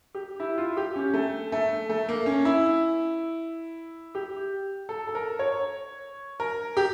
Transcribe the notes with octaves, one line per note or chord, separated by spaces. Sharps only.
G4
E4
F4
G4
C#4
A3
A3
A3
A#3
C#4
E4
G4
A4
A4
A#4
C#5
A#4
G4